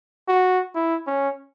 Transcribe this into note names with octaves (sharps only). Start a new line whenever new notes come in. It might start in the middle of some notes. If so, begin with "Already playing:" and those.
F#4
E4
C#4